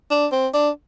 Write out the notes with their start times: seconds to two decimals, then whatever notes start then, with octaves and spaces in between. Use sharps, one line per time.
0.11 D4
0.32 C4
0.54 D4